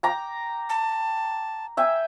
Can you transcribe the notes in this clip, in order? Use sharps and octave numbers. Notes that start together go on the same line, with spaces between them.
G5 A#5 D6
A5
E5 G5 G#5